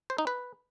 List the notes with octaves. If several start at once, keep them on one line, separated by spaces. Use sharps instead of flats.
C5
D#4
B4